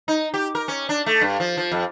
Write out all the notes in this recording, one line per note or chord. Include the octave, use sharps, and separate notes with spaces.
D#4
G4
A#4
C#4
D4
A3
G2
F3
F3
F2